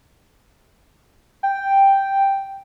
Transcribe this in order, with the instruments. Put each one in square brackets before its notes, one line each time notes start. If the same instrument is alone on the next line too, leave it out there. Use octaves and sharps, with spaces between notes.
[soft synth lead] G5